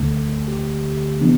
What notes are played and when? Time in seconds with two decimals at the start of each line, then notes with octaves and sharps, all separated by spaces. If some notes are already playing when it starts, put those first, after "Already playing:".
Already playing: D2 D3 A3
0.47 G4
1.21 C3 E3 B3 D4